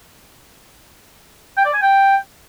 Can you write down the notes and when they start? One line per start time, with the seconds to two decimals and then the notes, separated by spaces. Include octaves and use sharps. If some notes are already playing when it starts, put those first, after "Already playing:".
1.57 G5
1.65 D5
1.74 G#5
1.82 G5